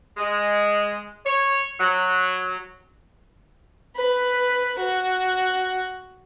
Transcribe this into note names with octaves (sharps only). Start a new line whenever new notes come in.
G#3
C#5
F#3
B4
F#4